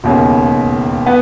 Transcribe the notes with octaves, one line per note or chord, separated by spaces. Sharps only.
E1 D#2 C#3
B3